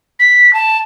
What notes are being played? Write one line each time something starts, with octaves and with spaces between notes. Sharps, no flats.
B6
A5